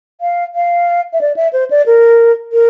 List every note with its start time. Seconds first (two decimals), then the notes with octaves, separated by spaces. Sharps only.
0.21 F5
0.55 F5
1.13 E5
1.21 D5
1.36 E5
1.53 C5
1.71 D5
1.86 A#4
2.52 A#4